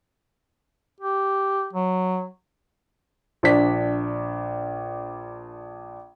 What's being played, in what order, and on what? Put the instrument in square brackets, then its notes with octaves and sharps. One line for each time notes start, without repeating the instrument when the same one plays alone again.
[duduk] G4
F#3
[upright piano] A#1 D4 B6